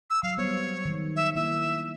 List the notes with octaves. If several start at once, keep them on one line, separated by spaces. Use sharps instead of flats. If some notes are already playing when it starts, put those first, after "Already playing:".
E6
F#3 F5
G3 B3 C5 C#5
D#3
E5
D#3 A#3 E4 E5